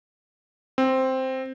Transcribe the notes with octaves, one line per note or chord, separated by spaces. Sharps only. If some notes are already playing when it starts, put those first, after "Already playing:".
C4